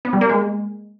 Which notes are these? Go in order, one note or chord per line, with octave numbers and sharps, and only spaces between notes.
B3
G3
A#3
G#3